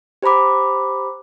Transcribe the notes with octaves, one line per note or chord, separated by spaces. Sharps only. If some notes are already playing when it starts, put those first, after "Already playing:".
G4 C5 A#5 B5 D6